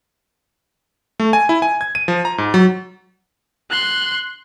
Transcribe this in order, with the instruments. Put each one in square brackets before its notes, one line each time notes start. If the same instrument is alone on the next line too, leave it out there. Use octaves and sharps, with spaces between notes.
[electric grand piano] A3
G#5
E4
G#5
G#6
D#7
F3
A#5
G#2
F#3
[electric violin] C6 F#6